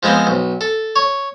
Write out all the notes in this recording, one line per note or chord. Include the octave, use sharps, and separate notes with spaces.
F3 G#3 B3 C4
B1
A4
C#5